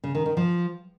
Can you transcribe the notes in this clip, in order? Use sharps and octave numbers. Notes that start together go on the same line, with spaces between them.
C#3
D#3
D#3
F3